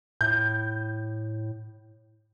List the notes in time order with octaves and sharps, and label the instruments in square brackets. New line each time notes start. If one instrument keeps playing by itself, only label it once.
[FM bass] A2 [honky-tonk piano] G6